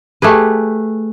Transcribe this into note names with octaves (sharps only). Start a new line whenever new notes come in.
A3 G4 G#4 B4